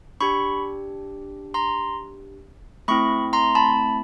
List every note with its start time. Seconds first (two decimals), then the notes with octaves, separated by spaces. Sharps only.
0.21 D4 G4 B5 C#6
1.54 A#5 C6
2.88 A3 C4 E4 B5 C#6
3.33 A#5 C6
3.55 A5 B5